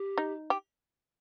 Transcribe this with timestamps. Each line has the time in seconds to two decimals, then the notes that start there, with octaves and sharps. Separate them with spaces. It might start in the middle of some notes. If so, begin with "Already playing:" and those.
Already playing: G4
0.18 D#4
0.50 G4